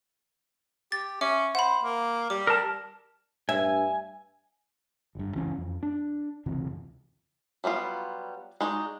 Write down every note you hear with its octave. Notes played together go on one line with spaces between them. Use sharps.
G4 A6
C#4 E5 D6
C5 F#5 B5
A#3
G3 D6
A#4 A5
G2 E5 G#5
G1 G2
G1 C#2 E3 C#4
F2
D4
F#1 C#2 C3 E3
F#3 G3 B3 F4
G#3 D#4 F#4 D5